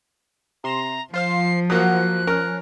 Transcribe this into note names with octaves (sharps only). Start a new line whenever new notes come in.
C3 A#5 C6 E7
F3 F4 C5 F5 C7
F#3 A#3 F#5 D#6 F#6
C#4 A#4